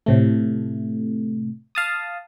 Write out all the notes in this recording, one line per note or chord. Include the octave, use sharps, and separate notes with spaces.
A2 C3 A3
F5 A5 D#6